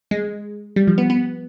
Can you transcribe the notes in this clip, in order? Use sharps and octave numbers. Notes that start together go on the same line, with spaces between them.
G#3
G3
F3
B3
B3